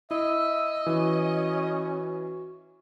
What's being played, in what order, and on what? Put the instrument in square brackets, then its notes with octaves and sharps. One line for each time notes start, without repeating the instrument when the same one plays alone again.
[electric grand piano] E4 [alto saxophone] D#5 [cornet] E5 [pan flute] E6
[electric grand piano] E3 [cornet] C#4 [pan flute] F#4